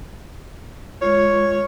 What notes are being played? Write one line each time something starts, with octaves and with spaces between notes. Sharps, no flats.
G#3 F4 C#5